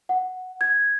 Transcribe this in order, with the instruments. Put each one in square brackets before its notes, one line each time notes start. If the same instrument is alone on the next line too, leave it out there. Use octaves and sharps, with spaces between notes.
[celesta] F#5
G#6